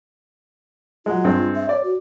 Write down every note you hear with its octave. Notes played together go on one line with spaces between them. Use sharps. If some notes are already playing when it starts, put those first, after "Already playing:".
F#3 G#3 F4
G2 G#3 C4
E5
C#5 D5
F#4